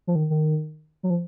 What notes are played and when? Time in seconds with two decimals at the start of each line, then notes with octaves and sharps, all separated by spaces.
0.07 F3
0.15 D#3
0.30 D#3
1.03 F#3
1.10 F3